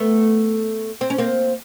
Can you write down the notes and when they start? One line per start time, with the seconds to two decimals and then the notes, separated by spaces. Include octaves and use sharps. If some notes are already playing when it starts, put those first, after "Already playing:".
Already playing: A3 B3
1.01 C4
1.10 C#4
1.18 A#3 C4